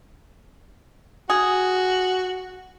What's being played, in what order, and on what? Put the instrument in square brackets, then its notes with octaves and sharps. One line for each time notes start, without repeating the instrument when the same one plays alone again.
[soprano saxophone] F#4 [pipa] G#4